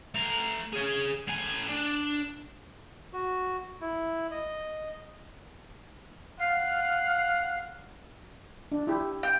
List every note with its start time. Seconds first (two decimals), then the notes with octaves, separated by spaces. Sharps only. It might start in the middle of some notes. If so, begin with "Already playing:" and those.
0.14 A3 A#5
0.73 G#4 C#5
1.27 A2 G#5
1.69 D4
3.13 F#4
3.81 E4
4.31 D#5
6.39 F5 F#5
8.72 D4
8.87 E4 G4
9.23 G5